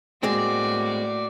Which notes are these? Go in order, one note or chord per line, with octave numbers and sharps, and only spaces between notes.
A2 G#3 A#3 C4 F#4 D5